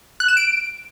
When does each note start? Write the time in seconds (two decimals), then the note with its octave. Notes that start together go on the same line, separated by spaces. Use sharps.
0.20 F#6
0.28 E7
0.37 D7